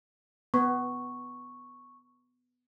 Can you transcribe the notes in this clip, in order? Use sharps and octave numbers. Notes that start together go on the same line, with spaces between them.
B3 C#6